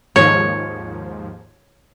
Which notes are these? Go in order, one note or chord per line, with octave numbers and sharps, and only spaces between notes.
D#2 G#2 F3 C#5